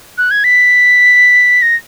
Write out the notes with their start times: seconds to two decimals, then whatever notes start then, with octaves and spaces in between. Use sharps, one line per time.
0.18 F#6
0.31 G#6
0.44 B6
1.62 A#6